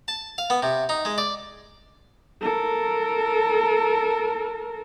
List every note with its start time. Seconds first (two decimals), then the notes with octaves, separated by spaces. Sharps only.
0.08 A5
0.38 F5
0.50 B3
0.63 C3
0.89 D#4
1.05 G#3
1.18 D5
2.41 A4 A#4